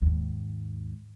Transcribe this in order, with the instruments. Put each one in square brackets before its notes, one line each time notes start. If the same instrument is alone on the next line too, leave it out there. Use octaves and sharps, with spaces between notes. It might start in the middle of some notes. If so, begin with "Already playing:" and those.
[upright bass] D#2 G#2